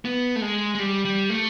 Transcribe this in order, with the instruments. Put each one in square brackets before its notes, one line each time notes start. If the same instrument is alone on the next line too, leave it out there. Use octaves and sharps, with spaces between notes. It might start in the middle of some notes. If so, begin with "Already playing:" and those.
[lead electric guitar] B3
A3
G#3
G#3
G3
G3
A3